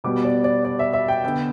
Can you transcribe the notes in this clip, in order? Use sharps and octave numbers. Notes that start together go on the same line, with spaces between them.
B2 G3 B3 D6
D5
D5
D5
E5
E5
G5
D3 B3 G5